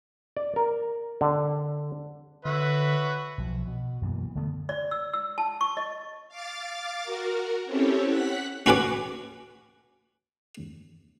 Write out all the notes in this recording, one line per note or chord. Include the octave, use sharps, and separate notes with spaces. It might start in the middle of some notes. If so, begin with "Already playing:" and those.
D5
A#4
D3
D3 F#4 B4 C#5 E5
B1 F3
B2
F#2 B2 E3 A#3
D3 A3 B3
D5
E6
E6
A5
C#6
D#5
F5 D6 A6
F#4 A#4
C4 C#4 E4 G4 A4 C#5
F#5 F#6 B6
C#4 F#4 B4 G#5 D6